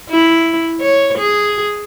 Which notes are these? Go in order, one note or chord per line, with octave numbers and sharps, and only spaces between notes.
E4
C#5
G#4